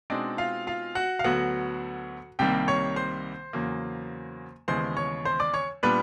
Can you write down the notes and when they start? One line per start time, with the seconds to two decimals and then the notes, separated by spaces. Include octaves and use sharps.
0.10 B2 G#3 C4 D4 D#4 D5
0.38 F4 F5
0.67 F4 F5
0.95 F#4 F#5
1.19 F5
1.24 D2 D3 F#3 B3 F#4 F#5
2.39 C2 C3 D#3 G3 A#3 G4 G5
2.68 C#5 C#6
2.96 C5 C6
3.53 E2 C#3 F#3 A#3
4.68 D#2 C#3 E3 G#3 B3 C5 C6
4.97 C#5 C#6
5.25 C5 C6
5.40 D5 D6
5.54 C#5 C#6
5.83 A#2 G3 B3 D4 B4 B5